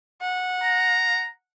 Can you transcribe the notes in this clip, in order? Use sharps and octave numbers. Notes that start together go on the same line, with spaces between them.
F#5
A#5